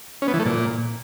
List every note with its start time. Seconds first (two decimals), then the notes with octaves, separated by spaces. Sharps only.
0.22 C#4
0.28 B3
0.34 E3
0.39 A3
0.45 A#2